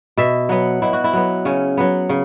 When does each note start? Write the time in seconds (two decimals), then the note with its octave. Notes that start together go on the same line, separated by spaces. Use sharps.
0.17 B2 E5
0.49 F#3 B3
0.82 B2 E4
0.93 F#4
1.04 E4
1.13 F#3 B3
1.45 C#3 C#4
1.77 F#3 B3
2.09 C#3